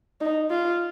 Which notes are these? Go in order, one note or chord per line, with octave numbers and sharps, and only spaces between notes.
D#4
F4